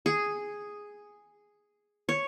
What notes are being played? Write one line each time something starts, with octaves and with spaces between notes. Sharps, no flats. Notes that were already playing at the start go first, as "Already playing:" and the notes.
G#4
C#5